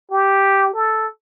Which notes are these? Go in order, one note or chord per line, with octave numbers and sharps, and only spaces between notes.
G4
A4